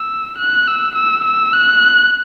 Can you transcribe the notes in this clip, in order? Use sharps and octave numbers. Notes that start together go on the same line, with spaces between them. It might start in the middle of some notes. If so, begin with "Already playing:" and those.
Already playing: E6
F#6
E6
E6
E6
F#6